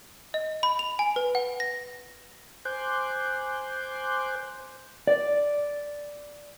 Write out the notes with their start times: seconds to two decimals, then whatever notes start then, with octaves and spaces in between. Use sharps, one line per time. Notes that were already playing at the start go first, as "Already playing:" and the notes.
0.34 D#5
0.63 B5
0.79 F7
0.99 G#5
1.16 B4
1.35 F#5
1.60 A#6
2.65 C5 G#5 C6 D6 F#6 G6
5.07 D5